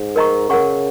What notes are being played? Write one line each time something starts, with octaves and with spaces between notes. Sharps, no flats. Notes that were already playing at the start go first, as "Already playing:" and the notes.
Already playing: G#2
A#4 D#5 A#5 C#6
C#3 A#4 F#5 C#6